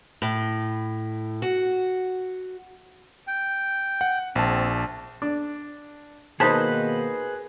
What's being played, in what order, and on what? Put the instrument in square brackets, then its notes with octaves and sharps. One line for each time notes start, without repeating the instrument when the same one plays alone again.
[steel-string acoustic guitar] A2
F#4
[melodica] G5
[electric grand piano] F#5
[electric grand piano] A#1 A5 [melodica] C4
[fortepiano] D4
[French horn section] B2 D#3 A#3 [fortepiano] D#4 C5 A5 [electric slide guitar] G#4 B4